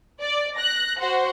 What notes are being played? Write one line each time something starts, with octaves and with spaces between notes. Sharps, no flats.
D5
F#6 A#6
F#4 C5 F#5